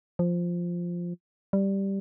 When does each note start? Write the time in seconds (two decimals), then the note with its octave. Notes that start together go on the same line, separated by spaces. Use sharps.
0.19 F3
1.53 G3